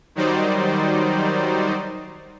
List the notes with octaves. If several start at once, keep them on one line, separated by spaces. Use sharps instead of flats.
D#3 F#3 G3 D#4 C5 D5